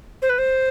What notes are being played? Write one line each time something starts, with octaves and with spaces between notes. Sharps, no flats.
C5
B4
C5